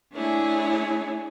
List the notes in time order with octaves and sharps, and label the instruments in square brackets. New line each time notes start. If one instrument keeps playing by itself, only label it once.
[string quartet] A3 D4 E4 G#4 C#5